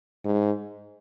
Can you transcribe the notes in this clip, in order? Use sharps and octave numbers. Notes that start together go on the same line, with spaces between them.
G#2